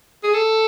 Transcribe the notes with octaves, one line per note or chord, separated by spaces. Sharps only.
G#4
A4